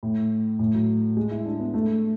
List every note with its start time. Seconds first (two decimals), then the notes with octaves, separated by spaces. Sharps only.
0.03 A2
0.59 A2
0.74 F#3
1.17 G#3
1.31 E4
1.45 D4
1.60 B3
1.74 A3